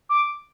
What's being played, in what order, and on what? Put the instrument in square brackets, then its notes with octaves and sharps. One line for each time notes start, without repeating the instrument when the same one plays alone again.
[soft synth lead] D6